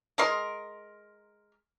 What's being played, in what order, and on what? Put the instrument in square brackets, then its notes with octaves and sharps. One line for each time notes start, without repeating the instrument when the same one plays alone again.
[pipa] G#3 A#4 C6